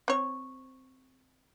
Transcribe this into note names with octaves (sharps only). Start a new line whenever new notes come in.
C4 C#5